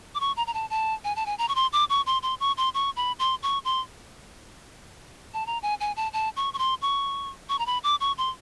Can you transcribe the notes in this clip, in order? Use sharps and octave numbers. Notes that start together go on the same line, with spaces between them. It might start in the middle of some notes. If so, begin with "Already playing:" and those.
D6
C#6
A#5
A#5
A5
A5
G#5
A5
G#5
A#5
C#6
C6
D6
C#6
C6
C6
C#6
C6
C#6
B5
C6
C#6
C6
A5
A#5
G#5
G#5
A5
A5
C#6
C#6
C6
C#6
C#6
A#5
B5
D6
C#6
C6